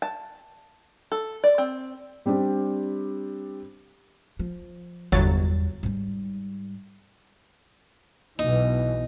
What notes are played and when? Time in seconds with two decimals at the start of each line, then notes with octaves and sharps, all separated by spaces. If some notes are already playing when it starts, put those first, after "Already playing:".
0.02 A5
1.12 A4
1.44 D5
1.58 C4
2.26 G3 C4 D4 G4
4.39 F3
5.12 G1 E2 F#3 G3 A6
5.83 G#2 G3
8.39 B1 B2 E3 D#4